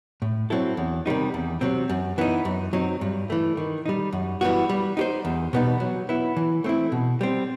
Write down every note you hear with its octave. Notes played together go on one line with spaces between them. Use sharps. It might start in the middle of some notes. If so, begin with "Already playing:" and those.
A2
F#3 C4 E4 A4
E2
C3 D#3 G3 D#4
E2
C3 F#3 C4
F#2
E3 B3 D#4
F#2
F#3 C4 D#4
G2
E3 A3
D#3
G3 D#4
F#2
E3 G3 B3 F#4
G3
D#4 G4 C5
E2
B2 G3 B3 D#4
F#3
B3 E4
E3
A3 C4 E4
B2
G3 C4